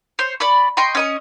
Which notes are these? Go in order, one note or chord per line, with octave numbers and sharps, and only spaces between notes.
C5 C#5
D5 B5 C#6
D#5 G5 C6 C#6
C#4 D#5 C#6